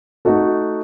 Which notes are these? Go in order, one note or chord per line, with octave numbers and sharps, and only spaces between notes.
A3 D#4 F#4 A4